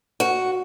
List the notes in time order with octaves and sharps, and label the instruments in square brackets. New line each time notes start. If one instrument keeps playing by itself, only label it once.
[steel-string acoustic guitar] F#4